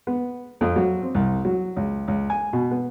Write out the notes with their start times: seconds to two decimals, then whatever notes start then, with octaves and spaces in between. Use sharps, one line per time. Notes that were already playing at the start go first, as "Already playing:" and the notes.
0.07 B3
0.61 F2
0.76 F#3
1.02 C4
1.15 C2
1.45 F#3
1.76 C#2
2.08 C#2
2.30 G#5
2.53 B2
2.71 B3